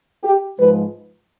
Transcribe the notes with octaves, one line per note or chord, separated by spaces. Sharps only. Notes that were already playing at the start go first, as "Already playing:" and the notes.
G4
G#2 F3 G#3 B4